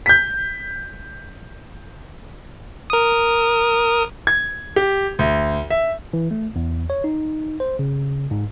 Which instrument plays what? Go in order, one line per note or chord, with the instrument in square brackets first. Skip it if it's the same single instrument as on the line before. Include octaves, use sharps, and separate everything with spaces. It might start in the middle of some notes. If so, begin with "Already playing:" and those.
[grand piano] G6 B6
[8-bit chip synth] A#4 D#6
[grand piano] G#6
G4
D2
E5
[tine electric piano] E3
A3
E2
C#5
D#4
C5
C#3
G#2